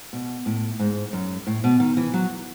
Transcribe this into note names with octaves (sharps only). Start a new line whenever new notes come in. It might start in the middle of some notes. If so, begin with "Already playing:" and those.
B2
A2
G#2
F#2
A2
B2
D#3
E3
F#3